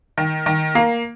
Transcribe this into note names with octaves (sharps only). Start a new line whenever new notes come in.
D#3
D#3
A#3